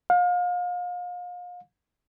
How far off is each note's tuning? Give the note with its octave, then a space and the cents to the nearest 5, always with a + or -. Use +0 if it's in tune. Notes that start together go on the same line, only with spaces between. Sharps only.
F5 +35